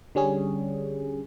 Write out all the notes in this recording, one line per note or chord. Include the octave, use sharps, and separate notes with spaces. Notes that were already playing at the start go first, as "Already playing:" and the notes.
D3 G3 C#4 G#4